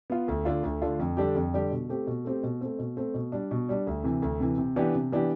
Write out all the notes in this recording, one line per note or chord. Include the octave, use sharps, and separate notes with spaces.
B3 F4
D2
D3 A3 D4 F4
D2
D3 A3 D4 F4
F2
D3 G3 D4 G4
F2
D3 G3 D4 G4
B2
A3 C4 G4
B2
A3 C4 G4
B2
A3 C4
B2
A3 C4
B2
G3 D4
B2
G3 D4
D2
C3 E3
D2
C3 E3
C3
E3 B3 D4 G4
C3
E3 B3 D4 G4